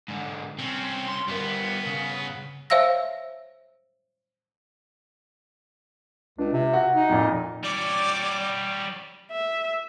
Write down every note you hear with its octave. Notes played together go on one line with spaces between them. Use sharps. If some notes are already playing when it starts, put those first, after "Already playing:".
G#2 D3
C2 C4 C#4
C6
G2 G3 B3 A#4
C#3
C5 C#5 E5 F5 E6 A#6
C#2 D4
C3
F#4
D#4
F2 A#2
G3 C#5 D5
E5